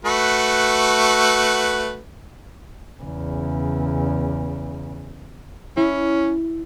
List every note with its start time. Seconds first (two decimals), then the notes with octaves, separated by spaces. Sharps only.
0.05 A3 F#4 B4
3.02 E2 C#3
5.77 C#4 E4